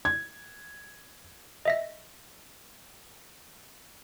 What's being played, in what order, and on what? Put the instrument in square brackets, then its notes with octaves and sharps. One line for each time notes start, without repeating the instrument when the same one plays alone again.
[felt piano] G#6
[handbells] D#5 E5 A#6